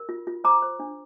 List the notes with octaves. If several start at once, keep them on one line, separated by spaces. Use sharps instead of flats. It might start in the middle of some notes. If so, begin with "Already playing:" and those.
Already playing: A#4
F4
F4
C5 A#5 D6
C5
D4